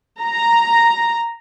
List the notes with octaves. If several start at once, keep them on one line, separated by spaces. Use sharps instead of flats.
A#5